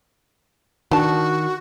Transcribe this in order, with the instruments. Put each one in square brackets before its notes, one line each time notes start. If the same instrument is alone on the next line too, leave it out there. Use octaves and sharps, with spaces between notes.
[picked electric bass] D#3 [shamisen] D4 A5 [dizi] F#4